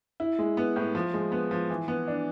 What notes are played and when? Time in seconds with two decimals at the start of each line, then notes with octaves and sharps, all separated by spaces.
0.20 E4
0.39 G#3
0.57 B3
0.76 A2
0.95 F3
1.13 G#3
1.32 B3
1.51 F3
1.70 E3
1.88 B3
2.08 D4